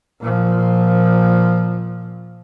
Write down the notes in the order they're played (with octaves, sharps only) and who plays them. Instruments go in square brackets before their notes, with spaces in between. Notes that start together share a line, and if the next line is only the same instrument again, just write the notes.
[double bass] A#2 F3